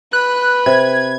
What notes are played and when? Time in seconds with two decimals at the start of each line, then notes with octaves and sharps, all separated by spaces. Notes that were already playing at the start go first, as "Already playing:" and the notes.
0.13 B4 F#6
0.66 C3 G#6